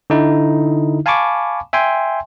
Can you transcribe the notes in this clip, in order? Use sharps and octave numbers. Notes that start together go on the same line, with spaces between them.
D3 D#4 E4
F5 G#5 A5 B5 C#6 D6
E5 G5 G#5 C6